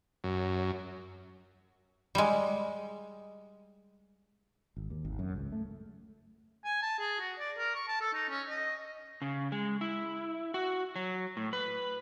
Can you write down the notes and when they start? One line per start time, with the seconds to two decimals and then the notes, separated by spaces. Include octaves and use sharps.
0.24 F#2
2.15 G3 G#3
4.77 G#1
4.90 D#2
5.05 G#1
5.19 F#2
5.35 C#2
5.52 A3
6.65 G#5
6.82 A5
6.99 G#4
7.20 F#4
7.39 D5
7.58 A#4
7.75 C#6
7.88 A5
8.01 A4
8.13 D#4
8.29 C#4
8.49 D#5
9.22 C#3
9.52 G#3
9.81 E4
10.54 F#4
10.96 F#3
11.37 A2
11.53 B4